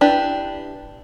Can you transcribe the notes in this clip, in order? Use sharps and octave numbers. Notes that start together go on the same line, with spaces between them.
D4 E4 G4 B4